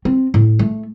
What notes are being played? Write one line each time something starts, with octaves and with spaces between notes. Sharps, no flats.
C4
A2
A3